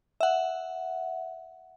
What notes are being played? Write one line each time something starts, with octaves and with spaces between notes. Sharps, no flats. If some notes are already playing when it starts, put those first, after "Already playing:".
E5 F#5